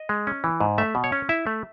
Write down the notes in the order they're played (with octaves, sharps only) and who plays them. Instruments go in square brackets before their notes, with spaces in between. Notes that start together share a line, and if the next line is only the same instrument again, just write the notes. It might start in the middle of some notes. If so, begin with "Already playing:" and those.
Already playing: [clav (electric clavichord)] D#5
G#3
C#4
E3
G#2
A3 E5
B2
C#5
C#4
E4 E5
A3